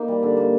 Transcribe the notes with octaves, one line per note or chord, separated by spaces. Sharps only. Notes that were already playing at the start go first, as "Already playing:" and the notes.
Already playing: A#3 D#4
G3
D3
A#3